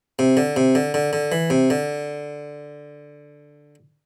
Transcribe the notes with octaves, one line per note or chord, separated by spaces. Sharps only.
C3
D3
C3
D3
D3
D3
E3
C3
D3